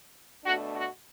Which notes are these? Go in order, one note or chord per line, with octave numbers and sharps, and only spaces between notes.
B2 A3 D4 F#4
F#4